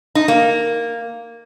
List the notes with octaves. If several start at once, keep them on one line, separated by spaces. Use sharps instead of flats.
D#4
A#3